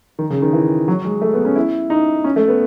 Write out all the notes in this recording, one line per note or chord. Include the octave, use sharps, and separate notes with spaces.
D#3
C#3
D#3
E3
F#3
G#3
A3
B3
C#4
E4
D#4
C#4
A3
B3